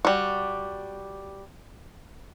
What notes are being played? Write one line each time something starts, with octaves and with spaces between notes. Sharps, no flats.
G3 F#4